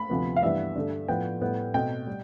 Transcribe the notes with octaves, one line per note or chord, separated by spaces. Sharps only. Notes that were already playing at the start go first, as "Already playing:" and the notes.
Already playing: B5
D2 C3 F3 B3
F5
G2 E3 G3 B3 E5
G2 D3 A3
A2 F3 B3 G5
A2 G3 B3
B2 A3 C4 G5
G3